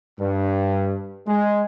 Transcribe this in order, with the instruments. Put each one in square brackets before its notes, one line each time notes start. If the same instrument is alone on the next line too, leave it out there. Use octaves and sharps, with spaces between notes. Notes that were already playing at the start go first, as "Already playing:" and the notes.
[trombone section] G2
G#3